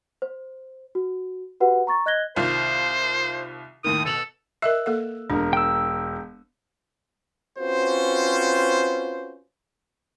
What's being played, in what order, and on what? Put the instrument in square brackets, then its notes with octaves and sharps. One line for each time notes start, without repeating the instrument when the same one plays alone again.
[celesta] C5
F#4
F#4 G4 B4 F#5
A#5 C#6 A6
D#5 F#6 G#6 A#6 G7
[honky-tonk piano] C2 D#3 F4 [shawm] C5
[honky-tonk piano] D#2 A2 D#3 [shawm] D#6
[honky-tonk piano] B2 F7 F#7 [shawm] A4
[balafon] A#4 D#5 E5 [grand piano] E6 F#6
[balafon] A#3 A4 F5
[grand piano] E1 A#4 [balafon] D4
[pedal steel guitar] G5 E6
[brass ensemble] C4 C#4 F4 F#4 B4 C5